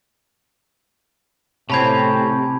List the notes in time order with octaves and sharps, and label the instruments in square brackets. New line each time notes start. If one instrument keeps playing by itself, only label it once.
[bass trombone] A2 [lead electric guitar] C3 [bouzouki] C4 C#4 [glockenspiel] A5 B5 G#6